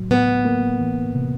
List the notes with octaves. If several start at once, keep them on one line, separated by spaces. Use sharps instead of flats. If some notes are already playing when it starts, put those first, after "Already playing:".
Already playing: A2 F#3
A2 B3
A#3
E3
C3